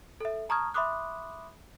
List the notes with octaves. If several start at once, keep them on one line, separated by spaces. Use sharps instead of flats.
A4 E5
A5 A#5 C#6 D#6 F6 G#6
E5 B5 C6 D6 D#6 F#6